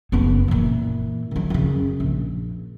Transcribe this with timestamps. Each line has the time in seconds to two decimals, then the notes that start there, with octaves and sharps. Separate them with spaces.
0.12 F#1 B3
0.48 A#2 E3
1.31 D#3 F#3
1.50 F#2 C#3
2.00 A#1